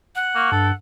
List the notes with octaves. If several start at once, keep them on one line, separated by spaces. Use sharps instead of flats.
F#5
A#3 C#6
G2 A4